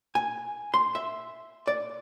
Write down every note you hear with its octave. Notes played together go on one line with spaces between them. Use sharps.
G#5
C6
E5
D5